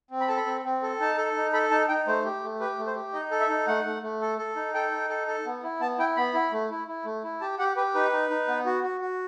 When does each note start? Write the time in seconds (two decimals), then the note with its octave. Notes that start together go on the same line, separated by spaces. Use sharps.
0.10 C4
0.21 B5
0.28 A4 A5
0.37 B5
0.46 C4
0.65 C4
0.82 A4
1.00 D#4 A5
1.17 A4
1.36 D#4
1.53 A4 B5
1.71 D#4 A5
1.89 D#4 G5
2.07 A3 C5
2.25 G4
2.43 A3
2.60 G4 B4
2.79 A3
2.87 C5
2.96 G4
3.13 D#4 D#5
3.31 A4
3.40 E5
3.49 D#4
3.67 A3 F#5
3.85 A3
4.03 A3
4.21 A4
4.38 A4
4.56 D#4
4.74 A4 G5
4.92 D#4
5.09 A4
5.27 A4
5.46 B3
5.63 E4
5.80 B3 A5
5.98 E4 G5
6.16 B3 B5
6.34 E4
6.52 A3
6.71 E4
6.88 E4
7.05 A3
7.24 E4
7.41 G4 A5
7.59 G4 F#5
7.77 G4 B4
7.95 D#4 B4
8.12 D#4
8.30 D#4
8.48 B3
8.66 F#4
8.84 F#4
9.01 F#4